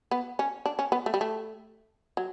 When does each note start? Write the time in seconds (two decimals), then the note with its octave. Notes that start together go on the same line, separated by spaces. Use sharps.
0.11 B3
0.39 C#4
0.66 D4
0.79 C#4
0.92 B3
1.06 A3
1.14 G3
1.21 A3
2.17 F#3